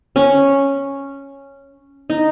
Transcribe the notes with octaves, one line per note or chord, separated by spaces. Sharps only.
C#4
D#4